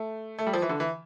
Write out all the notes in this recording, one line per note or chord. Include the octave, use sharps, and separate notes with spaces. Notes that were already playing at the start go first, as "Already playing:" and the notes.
Already playing: A3
A3
G3
F3
E3
D3
E3